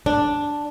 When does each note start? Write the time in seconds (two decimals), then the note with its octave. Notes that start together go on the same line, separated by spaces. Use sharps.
0.06 D4